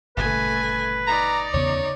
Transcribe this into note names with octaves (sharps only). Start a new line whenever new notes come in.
G1 A#2 C#3 A3 B4 G#5
D#4 D5 A#5
E2 C#3 B3 C#5